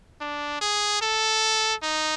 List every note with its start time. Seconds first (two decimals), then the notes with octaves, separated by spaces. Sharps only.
0.21 D4
0.62 G#4
1.02 A4
1.83 D#4